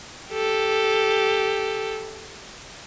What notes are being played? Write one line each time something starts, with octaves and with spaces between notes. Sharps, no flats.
G4 A4